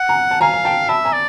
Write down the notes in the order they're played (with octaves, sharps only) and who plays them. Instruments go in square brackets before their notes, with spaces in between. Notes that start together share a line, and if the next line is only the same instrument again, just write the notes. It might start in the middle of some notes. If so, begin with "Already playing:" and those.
Already playing: [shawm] F#5
[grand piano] G#5 A#5
A5
[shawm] F5 [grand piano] G#5 A#5
[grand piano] G#5
G5 A5
[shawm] E5 [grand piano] A5 B5
[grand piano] G#5 A#5
[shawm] D5